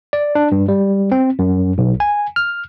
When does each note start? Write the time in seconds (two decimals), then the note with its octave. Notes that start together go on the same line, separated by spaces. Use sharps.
0.13 D5
0.35 D4
0.52 G2
0.68 G3
1.12 C4
1.39 F#2
1.78 B1
2.00 G#5
2.36 F6